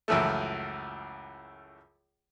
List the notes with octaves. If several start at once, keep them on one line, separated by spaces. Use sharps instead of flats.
C#2 F#2 E3 F3 A3